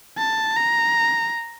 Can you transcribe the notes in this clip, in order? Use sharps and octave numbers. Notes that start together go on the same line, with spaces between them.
A5
A#5